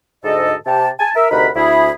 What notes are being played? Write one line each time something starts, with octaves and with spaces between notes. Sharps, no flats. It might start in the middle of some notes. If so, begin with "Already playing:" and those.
D2 G#2 A4 D#5
C3 G4 A5
G#5 A5
A#4 E5
D2 C3 D#4 A#4 F#5 B5
D2 E4 G#4 B5